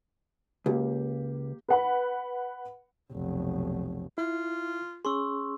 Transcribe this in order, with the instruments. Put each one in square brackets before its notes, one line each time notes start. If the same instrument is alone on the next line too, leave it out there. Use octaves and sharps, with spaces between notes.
[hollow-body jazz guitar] C#2 [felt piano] A#3 G4
[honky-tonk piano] B4 F#5 B5
[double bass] F1 B1
[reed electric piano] E4 [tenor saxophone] F4
[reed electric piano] C#4 G#4 [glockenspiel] C6 C#6 E6